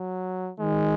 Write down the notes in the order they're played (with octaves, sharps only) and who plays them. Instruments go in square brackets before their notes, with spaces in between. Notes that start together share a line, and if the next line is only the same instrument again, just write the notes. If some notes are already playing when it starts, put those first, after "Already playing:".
Already playing: [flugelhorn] F#3
[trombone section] D#3 [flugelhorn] G#3